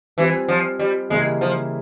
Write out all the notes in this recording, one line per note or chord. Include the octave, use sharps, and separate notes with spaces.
E3 G3 C4 F4
F3
G3
C#3 E3 G3 G#3 A#3 E4
F3